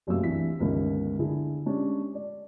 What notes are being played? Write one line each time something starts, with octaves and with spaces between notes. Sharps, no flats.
F#1 F#2 C3 A3 F5 E6
C2 E3 D4 B6
G1 C#2 D#3
D3 E4 G#4
G#3 C#4 D4 G4
D5